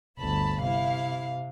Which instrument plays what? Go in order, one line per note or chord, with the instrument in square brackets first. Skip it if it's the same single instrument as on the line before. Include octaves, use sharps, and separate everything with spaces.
[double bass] G1 D2 [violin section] A5 B5
[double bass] C3 [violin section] E4 F5